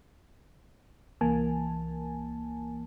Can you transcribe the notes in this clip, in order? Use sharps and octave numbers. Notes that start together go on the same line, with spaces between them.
C2 E3 A#3 G#5 A5